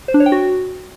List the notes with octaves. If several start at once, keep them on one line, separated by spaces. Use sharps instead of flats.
C5
D4
C#5
G5
F#4